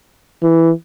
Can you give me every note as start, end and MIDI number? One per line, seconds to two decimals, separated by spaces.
0.43 0.70 52